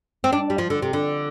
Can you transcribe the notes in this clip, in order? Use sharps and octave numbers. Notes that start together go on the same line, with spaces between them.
C4
D4
G3
F3
D3
C3
D3